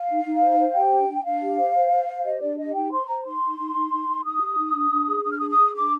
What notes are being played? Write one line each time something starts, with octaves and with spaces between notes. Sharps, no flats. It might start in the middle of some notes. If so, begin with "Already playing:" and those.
Already playing: F5
D#4
D#4
C5
C5
G4 G5
D4
D4
D4 F5
G4
C5
C5
C5
C5
G4 D#5
D4 D5
G4 D#5
D#4 G5
C5 C6
C5 A#5
D#4 C6
D#4
D#4
D#4
D#4
D#4
D#4 D#6
G4
D#4
D4
D4
G#4
D4 D#6
F6
G#4 D#6
D#6
G#4
D4 D6